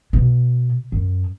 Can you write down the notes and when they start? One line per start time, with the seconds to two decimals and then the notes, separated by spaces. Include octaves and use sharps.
0.13 B2
0.92 F#2